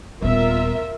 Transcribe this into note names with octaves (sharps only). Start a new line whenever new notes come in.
D#1 B3 F4 A#4 E5